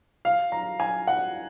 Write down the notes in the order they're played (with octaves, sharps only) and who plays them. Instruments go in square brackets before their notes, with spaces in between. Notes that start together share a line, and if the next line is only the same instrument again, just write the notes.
[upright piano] F5
A#5
G#5
F#5